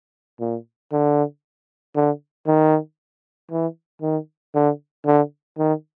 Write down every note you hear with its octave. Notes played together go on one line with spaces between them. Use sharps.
A#2
D3
D3
D#3
E3
D#3
D3
D3
D#3